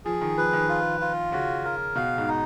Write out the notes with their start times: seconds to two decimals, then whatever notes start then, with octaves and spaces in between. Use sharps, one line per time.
0.05 F3 G#4
0.21 D#3
0.37 F3 B4
0.53 D#3
0.69 F4
1.00 F4
1.32 C#3 F#4
1.64 A#4
1.95 B2 F5
2.18 G#2
2.28 D#4